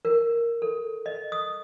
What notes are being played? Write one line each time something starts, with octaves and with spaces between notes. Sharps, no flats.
A#4
A4
D#5
D#6